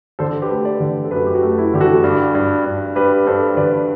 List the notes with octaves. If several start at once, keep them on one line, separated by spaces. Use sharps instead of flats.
D3 A4 C5
G4 B4
A3
B4 D5
D3
A4
F#2 G4 B4
G4
F#4
A3
E4
D3 G4
F#4 A4
G2
G2
G2
G2 G4 B4
G2 A4 C5
D3 B4 D5